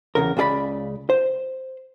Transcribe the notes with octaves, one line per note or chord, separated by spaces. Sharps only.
E2 A2 C#3 A#4
C#2 C#3 G#4 D5 B5
C5